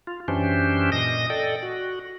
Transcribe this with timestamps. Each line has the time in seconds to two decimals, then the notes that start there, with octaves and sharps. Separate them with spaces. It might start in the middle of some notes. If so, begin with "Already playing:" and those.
0.07 F4
0.28 F#2 E3 C#4 D4 G4 C5
0.92 A#2 D#5 D#6 A#6
1.30 A4 D5 D#5 G5
1.63 F#4